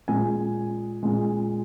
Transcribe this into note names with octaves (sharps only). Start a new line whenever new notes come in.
A#2 G#3 G#5
A#2 G#3